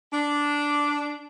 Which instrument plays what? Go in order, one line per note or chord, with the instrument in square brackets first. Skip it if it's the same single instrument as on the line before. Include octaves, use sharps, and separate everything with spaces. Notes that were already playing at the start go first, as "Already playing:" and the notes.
[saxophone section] D4